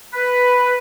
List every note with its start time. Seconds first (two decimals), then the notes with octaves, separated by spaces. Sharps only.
0.13 B4